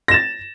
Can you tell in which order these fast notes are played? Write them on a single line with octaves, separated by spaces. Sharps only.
A#6 E7 A6